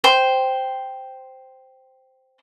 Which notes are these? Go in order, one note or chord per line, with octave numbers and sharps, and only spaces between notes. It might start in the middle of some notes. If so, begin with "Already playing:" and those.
C5 G5 C6